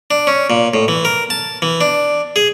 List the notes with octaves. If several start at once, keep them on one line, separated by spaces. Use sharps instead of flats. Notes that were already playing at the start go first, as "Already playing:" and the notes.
D4
C#4
A#2
A2
E3
A#4
A5
E3
D4
G#4